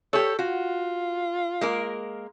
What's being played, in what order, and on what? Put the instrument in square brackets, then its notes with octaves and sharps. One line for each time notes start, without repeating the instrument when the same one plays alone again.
[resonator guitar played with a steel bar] G4 C#5 [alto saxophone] A4
[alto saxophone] F4 [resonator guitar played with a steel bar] F#4
[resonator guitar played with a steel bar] G#3 A#3 A#4